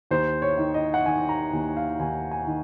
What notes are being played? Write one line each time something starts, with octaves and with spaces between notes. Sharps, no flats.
D#2 C5
C#5
D#3
D#5
F#5
D#3 G#5
A#5
D#2 G#5
F5
D#2 G#5
G#5
D#3